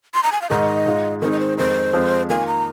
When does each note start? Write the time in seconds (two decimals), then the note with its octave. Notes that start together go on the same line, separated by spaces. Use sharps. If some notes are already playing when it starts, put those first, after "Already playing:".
0.14 C6
0.23 A#5
0.32 G#5
0.42 F5
0.50 G#2 D#3 G#3 D#5
0.86 G#2 G#3 F4
1.22 D#3 G#3 C4 D#4 A#4
1.32 D#5
1.40 C5
1.57 F2 D#3 G#3 D#4 C5
1.93 F2 F3 G#3 C4
2.29 D#3 A#3 F4 G#5
2.47 A#5